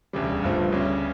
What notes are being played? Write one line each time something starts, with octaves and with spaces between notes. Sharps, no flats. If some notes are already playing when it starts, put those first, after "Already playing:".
E1 D2 C#3 G3
G1 G2 F3 A3
D2 C#3 G3 C#4